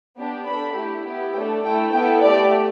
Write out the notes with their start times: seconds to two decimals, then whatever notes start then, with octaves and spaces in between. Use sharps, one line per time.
0.17 B3 D4 G4
0.46 D4 A4 B5
0.76 A3 E4 G4
1.06 B3 E4 G4
1.35 A3 D4 A4 G5
1.65 A3 E4 A4 G5
1.93 B3 E4 A4 G5
2.23 A3 G4 D5